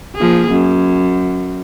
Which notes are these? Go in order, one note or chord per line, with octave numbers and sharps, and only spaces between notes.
F3 A#3 G#4
F#2